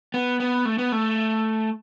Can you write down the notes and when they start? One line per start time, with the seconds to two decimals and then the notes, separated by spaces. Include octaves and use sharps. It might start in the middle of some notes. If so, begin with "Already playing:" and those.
0.14 B3
0.40 B3
0.65 A3
0.78 B3
0.92 A3